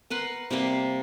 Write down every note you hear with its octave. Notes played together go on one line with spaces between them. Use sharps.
A#4 B4 F#5 C6
C3 G3 A#3 G4